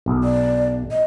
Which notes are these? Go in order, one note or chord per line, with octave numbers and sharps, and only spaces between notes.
B1
D5
D#5